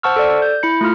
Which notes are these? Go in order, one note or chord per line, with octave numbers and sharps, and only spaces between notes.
C5 F#5 A5 C#6 E6 F6
A4 D5
G6
E4 B5 C#7
A3 F4 F6